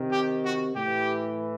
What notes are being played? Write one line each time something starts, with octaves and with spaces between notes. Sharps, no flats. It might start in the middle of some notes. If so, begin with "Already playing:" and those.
Already playing: C3 D#3
G4
F#4
A2 G4
E3